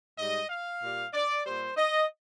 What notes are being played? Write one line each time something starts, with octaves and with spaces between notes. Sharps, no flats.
G#2 G3 D#5
F5
A#2 G3
D5
A#2 G3 C5
D#5